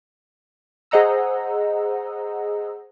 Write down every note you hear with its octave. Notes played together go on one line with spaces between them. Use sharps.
G#4 C5 D#5 F#5 A#5 E6